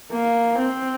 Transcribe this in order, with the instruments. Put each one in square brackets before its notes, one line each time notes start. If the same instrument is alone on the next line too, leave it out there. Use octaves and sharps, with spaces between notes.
[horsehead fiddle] A#3
C4